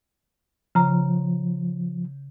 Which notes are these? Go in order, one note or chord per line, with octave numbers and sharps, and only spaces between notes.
C#3 F3 A#5